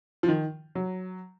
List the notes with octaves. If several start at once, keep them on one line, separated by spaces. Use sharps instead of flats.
F3
D#3
F#3